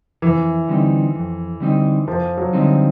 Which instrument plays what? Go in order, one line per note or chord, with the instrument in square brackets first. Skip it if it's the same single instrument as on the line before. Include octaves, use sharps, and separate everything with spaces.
[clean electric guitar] F2 [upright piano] E3
[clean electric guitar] D3 G3 C4 D#4
F2
D3 G3 C4 D#4
[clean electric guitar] F2 [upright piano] F3
[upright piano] F#3
[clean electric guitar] D3 G3 C4 D#4